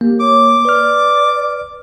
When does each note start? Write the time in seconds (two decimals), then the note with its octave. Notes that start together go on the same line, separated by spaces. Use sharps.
0.01 A#3 G4
0.20 C#5 D6
0.65 B4 D5 F6